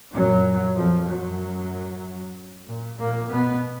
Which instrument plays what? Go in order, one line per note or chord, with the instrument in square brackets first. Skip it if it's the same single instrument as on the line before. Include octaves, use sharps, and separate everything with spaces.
[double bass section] F#2 A#2 F#3
F2 F3
F#2 F#3
A2
A#2
A#2 A#3
B2 B3